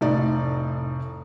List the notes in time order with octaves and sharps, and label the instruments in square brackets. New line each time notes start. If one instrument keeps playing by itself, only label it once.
[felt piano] F1 A2 D#4 D5